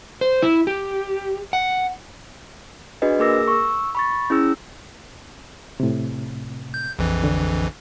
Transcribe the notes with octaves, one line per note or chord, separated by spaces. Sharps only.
C5
E4
G4
F#5
D4 F#4 G#4 B4 D#5
A#3 G#4 A#4 D6 E6 A#6
C#6 E6
B5 C#6 A6
C#4 E4 G#4 E6
A2 C3
G6
A#1 F2 E3
D3